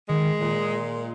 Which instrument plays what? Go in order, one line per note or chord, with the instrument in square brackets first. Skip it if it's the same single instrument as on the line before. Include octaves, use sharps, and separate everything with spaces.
[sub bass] D#3 [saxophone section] G#3
[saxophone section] A#2